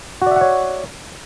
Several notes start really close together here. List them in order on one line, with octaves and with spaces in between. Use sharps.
F#4 D5 E5 F#5 C#5